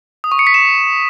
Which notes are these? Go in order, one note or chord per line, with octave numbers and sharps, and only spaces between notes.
D#6
C#6
C#7
B6
E7